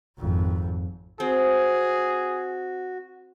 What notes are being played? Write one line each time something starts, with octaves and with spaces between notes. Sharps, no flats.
G#1 F2
C4 F#4 G#4